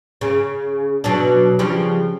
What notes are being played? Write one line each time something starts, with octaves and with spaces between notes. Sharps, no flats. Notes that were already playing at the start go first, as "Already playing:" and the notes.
C#3
B2 F#3 D4
C#3 F3 G3